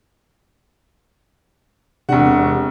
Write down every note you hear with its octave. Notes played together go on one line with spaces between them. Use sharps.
E1 C3 C4 D4 G4 F#5